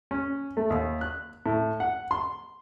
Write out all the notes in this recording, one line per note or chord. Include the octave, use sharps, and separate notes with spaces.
C#4
A3
D#2
F#6
A2
F#5
C6